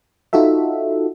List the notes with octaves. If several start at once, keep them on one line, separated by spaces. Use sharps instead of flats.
D#4 F4 F#4 A4 E5